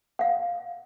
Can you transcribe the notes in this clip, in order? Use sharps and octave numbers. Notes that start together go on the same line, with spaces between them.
F5 F#5